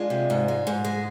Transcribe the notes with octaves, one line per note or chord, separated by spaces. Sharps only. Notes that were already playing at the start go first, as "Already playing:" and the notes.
Already playing: G#3 D4 F4
C3
G#2
G#3
G#2
G#3